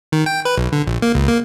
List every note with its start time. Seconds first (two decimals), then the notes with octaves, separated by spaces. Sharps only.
0.12 D#3
0.26 G5
0.45 B4
0.58 B1
0.72 D3
0.87 A#1
1.02 A#3
1.15 C#2
1.28 A#3